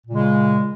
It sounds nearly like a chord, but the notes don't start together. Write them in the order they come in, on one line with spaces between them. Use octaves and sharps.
A#2 C#3 G#3